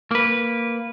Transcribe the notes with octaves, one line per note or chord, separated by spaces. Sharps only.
A#3 B4